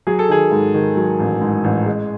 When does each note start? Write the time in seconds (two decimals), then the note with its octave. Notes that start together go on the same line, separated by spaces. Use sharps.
0.07 F#3 G#4
0.19 A4
0.29 D#3 G#4
0.51 G#2
0.74 D#3
0.97 F#3
1.19 A1
1.41 G#2
1.64 A1
1.86 G#3